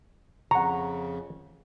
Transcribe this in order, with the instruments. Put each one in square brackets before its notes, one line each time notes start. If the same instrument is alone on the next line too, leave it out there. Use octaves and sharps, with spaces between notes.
[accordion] F2 C#3 [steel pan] F#5 C#6 [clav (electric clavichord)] A#5